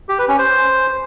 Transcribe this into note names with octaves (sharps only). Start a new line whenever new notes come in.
G4
B4
C#4
C5